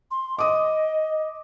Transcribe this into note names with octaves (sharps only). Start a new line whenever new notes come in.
C6
D#5 D6 D#6